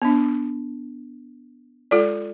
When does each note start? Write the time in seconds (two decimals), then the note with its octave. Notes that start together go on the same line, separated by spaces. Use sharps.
0.02 B3 D4
1.91 G#3 F4 A4 D5